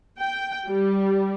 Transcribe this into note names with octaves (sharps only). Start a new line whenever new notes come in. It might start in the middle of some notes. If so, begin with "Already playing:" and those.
G5
G3